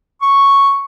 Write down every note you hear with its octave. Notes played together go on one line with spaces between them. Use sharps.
C#6